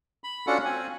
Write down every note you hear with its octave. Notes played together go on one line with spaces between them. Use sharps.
B5
C#4 D4 F4 F#4 A4 F#5
C4 G#5